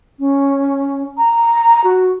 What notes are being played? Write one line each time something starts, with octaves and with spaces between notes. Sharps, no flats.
C#4
A#5
F#4